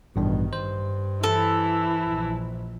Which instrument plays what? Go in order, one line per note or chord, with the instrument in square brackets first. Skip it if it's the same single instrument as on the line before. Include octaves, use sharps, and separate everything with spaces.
[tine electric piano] A1 G2 D4 [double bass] B2 D#3
[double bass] G2 [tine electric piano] C5
[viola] E3 E4 [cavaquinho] A4
[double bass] A#1